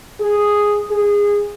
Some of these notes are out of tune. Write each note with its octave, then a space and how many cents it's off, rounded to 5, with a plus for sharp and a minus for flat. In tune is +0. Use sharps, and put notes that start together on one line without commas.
G#4 -5
G#4 -20